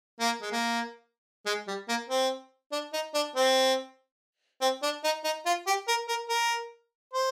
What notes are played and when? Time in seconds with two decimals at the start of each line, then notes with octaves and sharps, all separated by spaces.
0.20 A#3
0.42 G#3
0.52 A#3
1.46 G#3
1.67 G3
1.89 A#3
2.09 C4
2.72 D4
2.93 D#4
3.14 D4
3.36 C4
4.61 C4
4.83 D4
5.04 D#4
5.24 D#4
5.46 F4
5.67 G4
5.88 A#4
6.08 A#4
6.29 A#4
7.14 C5